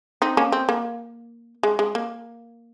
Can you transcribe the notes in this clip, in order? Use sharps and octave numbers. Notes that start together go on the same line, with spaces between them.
C4 D#4
A#3 C#4
C4
A#3
G#3
G#3
A#3